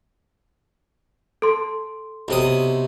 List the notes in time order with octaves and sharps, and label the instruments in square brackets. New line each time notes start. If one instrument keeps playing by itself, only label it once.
[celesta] A4 C6
[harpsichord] B1 C3 D#6